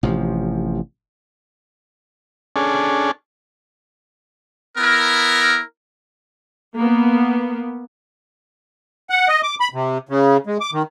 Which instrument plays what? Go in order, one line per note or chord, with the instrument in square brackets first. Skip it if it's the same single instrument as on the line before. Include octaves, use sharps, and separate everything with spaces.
[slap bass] A1 C3 F3
[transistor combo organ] C#4 D4 G#4 A4
[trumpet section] B3 E4 A#4
[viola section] A#3 B3
[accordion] F#5
D#5
D6
B5
C3
C#3
G#3
D6
D#3